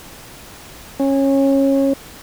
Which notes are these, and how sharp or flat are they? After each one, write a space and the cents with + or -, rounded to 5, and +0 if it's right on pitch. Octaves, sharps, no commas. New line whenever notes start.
C#4 -20